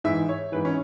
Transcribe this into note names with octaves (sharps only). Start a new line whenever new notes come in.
G#2 E3 E5
C#5
G#2 E3 B4
C#4